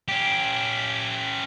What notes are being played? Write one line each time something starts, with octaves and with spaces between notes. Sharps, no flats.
C#4 G4